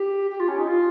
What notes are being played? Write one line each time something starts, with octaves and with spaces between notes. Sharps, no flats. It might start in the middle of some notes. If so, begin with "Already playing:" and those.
Already playing: G4
G4
F4
C#4
D#4
F4